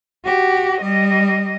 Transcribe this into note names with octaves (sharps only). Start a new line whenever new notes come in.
F#4 G4
G3 D#5